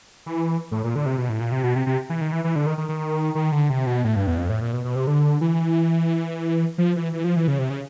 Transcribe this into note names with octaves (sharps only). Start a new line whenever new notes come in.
E3
A2
A#2
D3
C3
B2
A2
A#2
C3
B2
C3
C3
E3
D#3
E3
E3
D3
D#3
D#3
D#3
D#3
D3
C3
B2
A2
G2
E2
F2
A2
A#2
B2
B2
C3
D3
E3
F3
E3
E3
F3
E3
C#3
C3
C#3